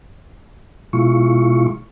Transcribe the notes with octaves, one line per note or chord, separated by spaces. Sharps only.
B2 G#3 E4 F4 C#6